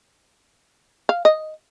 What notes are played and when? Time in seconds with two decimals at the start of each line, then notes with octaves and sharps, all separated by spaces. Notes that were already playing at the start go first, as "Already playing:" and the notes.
1.09 F5
1.25 D#5